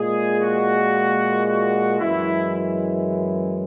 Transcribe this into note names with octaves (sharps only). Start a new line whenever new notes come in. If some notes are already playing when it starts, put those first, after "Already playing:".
Already playing: A#2 G#3 G#4
F#4
F#4
F#2 E3 G#3 E4